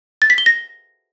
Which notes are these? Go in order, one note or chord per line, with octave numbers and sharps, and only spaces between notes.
A6
B6
G7
A#6